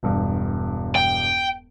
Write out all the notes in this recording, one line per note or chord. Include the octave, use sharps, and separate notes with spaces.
E1 G2
G5